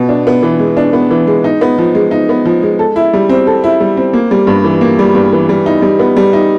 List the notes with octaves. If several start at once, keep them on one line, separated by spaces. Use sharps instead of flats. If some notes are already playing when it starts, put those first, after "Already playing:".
Already playing: B2
D4
B3
E3
G#3
D4
B3
E3
G#3
D#4
B3
F3
G#3
D#4
B3
F3
G#3
A4
E4
G3
C4
A4
E4
G3
C4
A#3
G3
G2
E3
A#3
G3
G2
E3
G3
D#4
G3
B3
G3
D#4